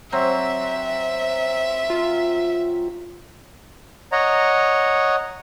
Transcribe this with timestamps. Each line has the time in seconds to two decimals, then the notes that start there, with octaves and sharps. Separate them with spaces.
0.12 F#3 C4 E5
1.90 F4
4.12 C#5 D#5 F#5 A#5